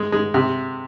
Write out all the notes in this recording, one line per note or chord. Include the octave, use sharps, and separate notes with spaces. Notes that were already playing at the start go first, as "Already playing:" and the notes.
Already playing: G#3
G#3
C3